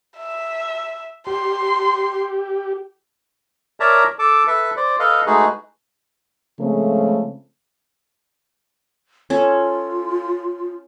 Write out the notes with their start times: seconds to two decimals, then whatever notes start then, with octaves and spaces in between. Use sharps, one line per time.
0.17 E5
1.27 G4 C6
3.80 A#4 C#5 D5 E5 A5 A#5
4.19 A4 A5 D6
4.47 A4 B4 E5
4.77 C5 D5
5.00 A4 B4 D#5 F5
5.27 G#3 A3 D#4 F#4 G#4 B4
6.60 C#3 F3 G#3 A3 C4
9.30 C#4 F4 A4